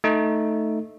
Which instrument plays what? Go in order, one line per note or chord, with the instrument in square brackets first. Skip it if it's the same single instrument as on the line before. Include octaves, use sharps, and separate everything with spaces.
[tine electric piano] A3 D#4